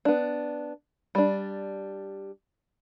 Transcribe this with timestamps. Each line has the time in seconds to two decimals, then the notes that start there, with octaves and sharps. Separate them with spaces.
0.05 B3 D4
1.15 G3 D4